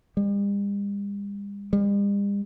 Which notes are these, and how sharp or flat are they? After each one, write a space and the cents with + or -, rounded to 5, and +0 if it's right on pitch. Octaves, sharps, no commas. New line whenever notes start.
G3 +45
G3 +45